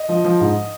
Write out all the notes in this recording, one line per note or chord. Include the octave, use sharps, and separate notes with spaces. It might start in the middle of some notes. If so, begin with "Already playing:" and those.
Already playing: D#5
F3
F3
G#2